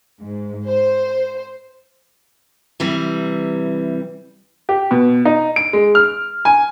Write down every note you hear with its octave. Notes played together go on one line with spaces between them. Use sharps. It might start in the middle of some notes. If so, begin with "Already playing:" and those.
G#2
C5
C3 E3 G3
G4
B2
D#4
D7
G#3
F6
G#5